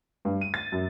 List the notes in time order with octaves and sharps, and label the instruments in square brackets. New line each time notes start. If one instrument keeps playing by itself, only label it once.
[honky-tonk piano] G2
D#7
A6
F#2